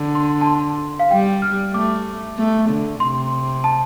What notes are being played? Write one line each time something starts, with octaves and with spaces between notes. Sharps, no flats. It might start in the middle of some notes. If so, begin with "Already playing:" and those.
Already playing: D3
C6
A5
C6
F5
G3 G5
F6
A3 D6
A3
D3
C3 C6
A5